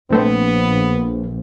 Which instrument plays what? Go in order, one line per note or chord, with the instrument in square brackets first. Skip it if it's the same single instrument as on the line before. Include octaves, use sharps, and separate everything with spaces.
[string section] A#1 [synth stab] C3 A3 C4 [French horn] B3 [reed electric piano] D4 B4